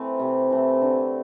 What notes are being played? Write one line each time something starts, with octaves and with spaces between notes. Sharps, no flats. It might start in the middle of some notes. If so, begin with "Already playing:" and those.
Already playing: E3 A3 C4
C3
E3 A3 C4
D3